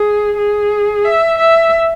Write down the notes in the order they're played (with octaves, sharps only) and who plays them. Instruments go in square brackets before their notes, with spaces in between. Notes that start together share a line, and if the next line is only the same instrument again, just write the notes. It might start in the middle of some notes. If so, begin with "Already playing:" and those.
Already playing: [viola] G#4
G#4
E5
E5